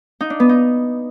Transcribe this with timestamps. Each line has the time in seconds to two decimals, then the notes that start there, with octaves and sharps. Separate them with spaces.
0.21 D#4
0.30 D4
0.40 B3
0.49 D#4